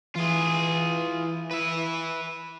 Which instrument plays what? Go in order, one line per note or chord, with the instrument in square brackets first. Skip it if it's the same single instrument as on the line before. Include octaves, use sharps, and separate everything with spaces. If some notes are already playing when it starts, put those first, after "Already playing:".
[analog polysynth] E3 [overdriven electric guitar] F4 G#4
[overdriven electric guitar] B4 E5